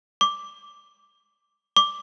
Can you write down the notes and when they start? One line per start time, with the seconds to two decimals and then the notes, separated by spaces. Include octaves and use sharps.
0.21 D6
1.76 D6